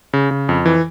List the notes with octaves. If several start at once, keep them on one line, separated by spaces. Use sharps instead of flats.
C#3
C#3
F2
E3